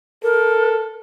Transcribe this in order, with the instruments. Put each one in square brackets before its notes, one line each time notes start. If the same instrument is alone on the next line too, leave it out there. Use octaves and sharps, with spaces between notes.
[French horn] A4 [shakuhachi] A#4